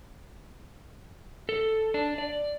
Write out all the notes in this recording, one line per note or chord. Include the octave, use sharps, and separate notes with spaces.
A4
D4
D5